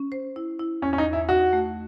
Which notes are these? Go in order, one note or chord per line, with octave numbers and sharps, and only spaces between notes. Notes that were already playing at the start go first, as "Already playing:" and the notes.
Already playing: C#4
C5
E4
E4
E2 C#4
C#4
D#4
E2
E4
D#4 F#4
A3